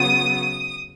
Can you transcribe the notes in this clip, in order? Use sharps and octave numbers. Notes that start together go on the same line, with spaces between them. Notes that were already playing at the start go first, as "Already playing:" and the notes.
Already playing: C#3 F#3 B3 D#6